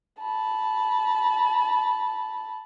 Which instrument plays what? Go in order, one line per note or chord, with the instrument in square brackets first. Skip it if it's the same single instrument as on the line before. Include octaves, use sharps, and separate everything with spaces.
[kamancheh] A5 B5